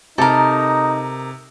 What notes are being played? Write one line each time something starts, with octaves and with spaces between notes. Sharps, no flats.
C3 D#4 A4 A#4